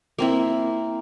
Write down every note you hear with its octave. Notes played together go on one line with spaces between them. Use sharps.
A#3 C4 E4